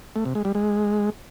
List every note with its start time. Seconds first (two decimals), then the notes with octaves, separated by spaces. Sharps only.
0.16 A3
0.25 C3
0.35 G#3
0.45 G3
0.55 G#3